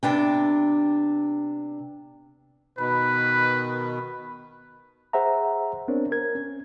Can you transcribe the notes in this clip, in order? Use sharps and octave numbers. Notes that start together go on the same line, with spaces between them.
C3 B3 D4 G5
B2 D#3 B4 B5
G#4 C5 E5 F#5 A#5
B3 C4 D4 A#4 C5 C#5
A#4 G#6
C#4